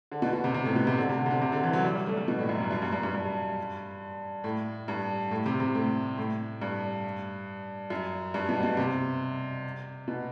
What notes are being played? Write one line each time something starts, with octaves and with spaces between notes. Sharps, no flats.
D3
B2
B2
C3
C3
A2
B2
C3
D3
C3
D3
C3
D3
C3
D3
E3
F#3
G3
G3
A3
G3
B2
A2
F#2
G2
F#2
G2
G2
G2
G2
A2
G2
A2
C3
C3
A2
A2
G2
F#2
G2
B2
B2
C3
B2